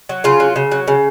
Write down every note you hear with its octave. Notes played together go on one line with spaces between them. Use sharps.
F#3
C#3 F4
F#3
C#3
F#3
C#3